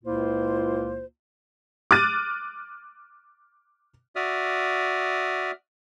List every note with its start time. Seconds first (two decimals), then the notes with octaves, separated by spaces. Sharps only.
0.04 C#2 A#2 A#3 E4 F4 C5
1.91 D6 F6 F#6 A6 D#7
4.16 F#4 D5 E5 D#6 F6